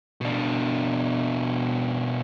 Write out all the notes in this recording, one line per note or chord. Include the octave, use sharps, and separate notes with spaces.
B2 D4